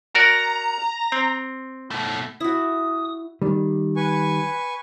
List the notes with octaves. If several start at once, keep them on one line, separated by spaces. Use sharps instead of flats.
F#4 A#4 D5 A#5
C4
B2 A3
E4 F#4 D#6
D#3 G3
B4 G#5 C#6